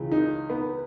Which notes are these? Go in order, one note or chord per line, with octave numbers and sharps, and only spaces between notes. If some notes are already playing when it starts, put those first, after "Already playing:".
Already playing: C#2 C#3 E3
D#4
B3